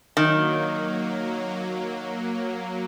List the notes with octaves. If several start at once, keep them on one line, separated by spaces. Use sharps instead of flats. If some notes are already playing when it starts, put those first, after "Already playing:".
D#3 F#3 A#3